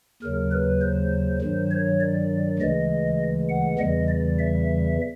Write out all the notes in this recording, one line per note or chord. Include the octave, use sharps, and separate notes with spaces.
D#2 C#3 F#3 A#4
B4
C5
G2 D#3 F#3
C#5
D5
D2 C#3 E3 G#3 D#5
F#5
E2 C#3 E3 G3 D#5
D5
E5